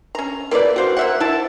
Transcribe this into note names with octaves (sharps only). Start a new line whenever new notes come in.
C#4 A#5
A#3 E4 B4 D5
F#4 C5 F5
A#3 E5 F#5
E4 A5